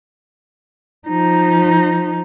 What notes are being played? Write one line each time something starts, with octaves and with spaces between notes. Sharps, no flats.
F3 D#4